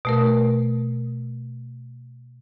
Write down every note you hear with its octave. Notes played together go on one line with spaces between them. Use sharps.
B2 A3 A#4